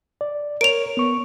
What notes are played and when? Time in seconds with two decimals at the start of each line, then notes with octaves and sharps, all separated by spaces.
0.21 D5
0.61 A#4 C#5 D7 F7
0.97 B3 C#6